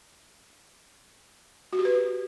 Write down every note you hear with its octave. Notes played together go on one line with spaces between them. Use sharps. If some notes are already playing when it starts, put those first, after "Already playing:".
F#4
G4
B4